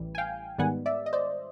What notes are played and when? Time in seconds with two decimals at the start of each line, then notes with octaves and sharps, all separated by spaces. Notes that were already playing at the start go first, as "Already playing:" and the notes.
Already playing: A1 A2 E3 G3
0.15 G#5
0.18 F5 G5
0.58 G#2 D#3 G3 B3 F#5 G#5
0.86 D5 E5
1.06 D#5
1.13 C5 D5